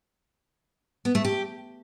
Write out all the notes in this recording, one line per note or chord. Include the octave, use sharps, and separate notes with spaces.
B3
A3
G4